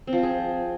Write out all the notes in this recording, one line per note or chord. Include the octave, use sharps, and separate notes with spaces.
C4
F3
C4
G#4